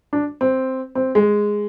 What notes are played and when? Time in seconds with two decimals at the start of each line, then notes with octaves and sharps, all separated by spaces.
0.13 D4
0.41 C4
0.95 C4
1.15 G#3